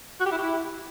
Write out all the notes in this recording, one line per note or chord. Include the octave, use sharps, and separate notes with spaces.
F#4
G4
E4
G4
E4